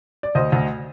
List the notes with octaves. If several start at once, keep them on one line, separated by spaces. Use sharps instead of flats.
D5
D2 C5 D#5
D2